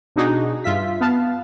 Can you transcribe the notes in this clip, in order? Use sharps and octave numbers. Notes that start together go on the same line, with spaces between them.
B2 D4 D#4 F#4 G#4
G2 F4 E5 B6
B3 F5 A5